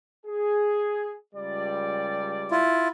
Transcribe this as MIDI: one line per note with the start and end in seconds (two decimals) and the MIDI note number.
0.26 1.15 68
1.35 2.63 37
1.35 2.63 55
1.35 2.63 74
2.51 2.88 64
2.51 2.88 65